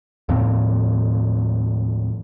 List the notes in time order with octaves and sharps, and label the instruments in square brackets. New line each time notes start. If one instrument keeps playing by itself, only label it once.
[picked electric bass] D#2 A2 F3 C4